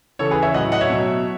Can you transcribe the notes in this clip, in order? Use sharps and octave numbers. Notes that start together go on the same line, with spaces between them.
C#3 E3 A4 C#5
G#4 B4
C#5 E5
A2 F#3 D#5 F#5
D#5 F#5
C#5 E5
B2 F#3